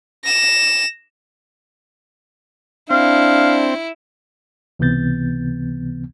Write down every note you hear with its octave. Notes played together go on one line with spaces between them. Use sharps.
A#6 E7
C4 D4 E4 F5
C#2 C3 E3 B3 G6 A6